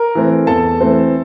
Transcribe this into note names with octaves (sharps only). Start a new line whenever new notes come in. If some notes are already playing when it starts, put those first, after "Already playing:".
Already playing: A#4 A#5
E3 A3 C4
E2 A4 A5
E3 A3 C4